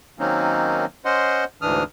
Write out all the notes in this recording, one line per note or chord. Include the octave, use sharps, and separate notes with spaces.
D#3 F#3 A#3 C4 C#4 D#4
C#4 C5 D#5 F#5 C6
D2 G#2 E3 D4 D#6 F6